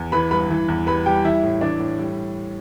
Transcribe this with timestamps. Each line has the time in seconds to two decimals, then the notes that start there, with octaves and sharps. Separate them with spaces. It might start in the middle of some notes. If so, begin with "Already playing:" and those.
Already playing: E2
0.12 E3 B4 B5
0.31 G2 B4 B5
0.50 E3
0.68 E2
0.87 G3 B4 B5
1.06 G3 G4 G5
1.24 E3 E4 E5
1.43 A2
1.61 E3 D4 D5
1.80 A2
1.99 G3